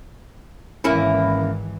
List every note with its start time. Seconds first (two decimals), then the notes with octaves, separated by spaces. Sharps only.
0.84 G#1 E3 A#3 C#4 E4